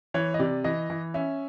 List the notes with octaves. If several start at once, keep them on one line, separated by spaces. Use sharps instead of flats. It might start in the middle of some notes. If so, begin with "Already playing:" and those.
E3 C#5
D#5
C3 D5
E3 D#5
E3
C#4 E5